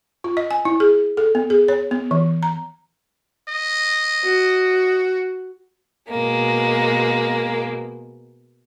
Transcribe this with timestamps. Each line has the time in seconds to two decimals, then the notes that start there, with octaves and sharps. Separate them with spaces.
0.24 F4
0.37 D#5
0.51 G#5
0.65 E4
0.80 G#4
1.17 A4
1.35 B3
1.50 G#4
1.68 C#5
1.91 B3
2.11 E3
2.43 A#5
3.48 D#5
4.24 F#4
6.10 B2 G#3 A#3